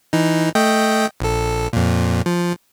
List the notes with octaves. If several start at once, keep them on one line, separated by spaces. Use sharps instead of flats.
E3 D#4
A3 D#5 G5
A#1 A4
F2 A#2
F3